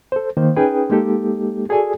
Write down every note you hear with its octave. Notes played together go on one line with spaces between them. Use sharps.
A4 C5
D#3 A#3 C5
C#4 D#4 G#4 B4 G5
G#3 A#3 D#4 G4 A4
F#4 G#4 A4 D5 G#5